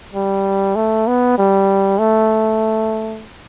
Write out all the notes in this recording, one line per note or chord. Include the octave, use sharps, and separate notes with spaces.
G3
A3
B3
G3
A3